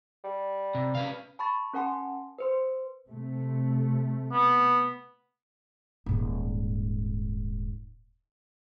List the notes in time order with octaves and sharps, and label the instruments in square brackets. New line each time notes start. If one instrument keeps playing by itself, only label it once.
[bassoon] G3
[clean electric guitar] C3
C#4 B4 F5
[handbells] A5 B5 C#6 A6
C#4 A#4 F#5 G#5 A5 C6
B4 C5 C6
[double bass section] C3 A3
[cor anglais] B3
[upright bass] D#1 G#2